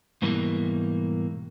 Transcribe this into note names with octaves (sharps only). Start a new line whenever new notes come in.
G#2 B2 E3 G3 A3 A#3